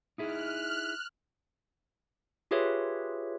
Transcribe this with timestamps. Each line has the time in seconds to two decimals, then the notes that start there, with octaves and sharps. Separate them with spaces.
0.18 D#4 E4 G#4 F6 F#6
2.51 F4 G4 G#4 B4 C#5 E5